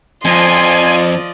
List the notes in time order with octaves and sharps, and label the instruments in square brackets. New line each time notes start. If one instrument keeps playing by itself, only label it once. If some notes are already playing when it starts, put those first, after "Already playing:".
[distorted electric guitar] F2 [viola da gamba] F3 D5 D#5 [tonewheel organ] G#5 [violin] C6